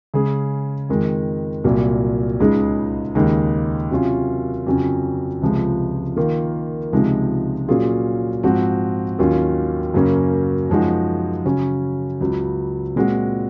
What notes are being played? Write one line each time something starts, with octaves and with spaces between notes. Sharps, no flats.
C#3 G#3 C#4 G#4
F2 D#3 G#3
C2 A#2 F#3
C#2 C#3 G#3 D#4 G#4
D#2 C#3 G#3 D#4
C3 F#3 C#4 F4
F2 C#3 F#3 C#4
C#2 C3 F3 G#3
D#3 A#3 F4
C#2 C3 F3 G#3 D#4
A#2 F#3 C#4 F4 G#4
G#2 F3 C4 F#4
D#2 D#3 F#3 C#4 F4
F#2 C#3 F#3 A#3 C#4
F#2 F3 G#3 D#4 F#4
C#3 F#3 C#4
C#2 C#3 F#3
A#2 G#3 C4 F#4